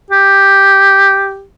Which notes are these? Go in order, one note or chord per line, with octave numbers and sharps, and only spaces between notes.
G4